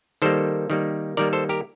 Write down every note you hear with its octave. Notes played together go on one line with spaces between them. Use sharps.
D#3 G3 A#3 A4 C5
D#3 G3 A#3
D#3 G3 A#3 A#4 D5
A4 C5
G4 A#4